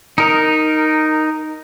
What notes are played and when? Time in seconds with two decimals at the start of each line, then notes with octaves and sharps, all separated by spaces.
0.18 D#4 A#4